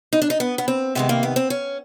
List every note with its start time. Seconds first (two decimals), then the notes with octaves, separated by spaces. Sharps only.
0.13 D#4
0.22 D4
0.30 D#4
0.40 B3
0.58 B3
0.68 C4
0.95 C3 D#3 G#3 B3
1.09 A#3
1.23 B3
1.36 C4
1.50 C#4